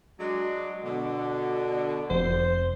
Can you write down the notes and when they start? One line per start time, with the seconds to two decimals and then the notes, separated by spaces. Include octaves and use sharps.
0.19 F#3 G#3 D4
0.83 B2 D3
2.10 F1 C5